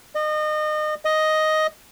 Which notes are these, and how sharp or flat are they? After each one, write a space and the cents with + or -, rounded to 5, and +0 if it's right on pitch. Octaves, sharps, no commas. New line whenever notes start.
D#5 -30
D#5 +5